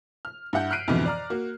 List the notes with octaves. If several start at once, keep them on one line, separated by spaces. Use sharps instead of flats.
F6
G2 E4 F#5 G6
F6 F#6 B6 C7 D7 D#7
F2 G#2 B2 D3 E3 F3
D5 A#5 F6
A#3 F#4